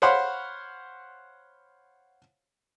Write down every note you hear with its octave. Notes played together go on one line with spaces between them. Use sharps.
C5 C#5 F5 F#5 B5 C6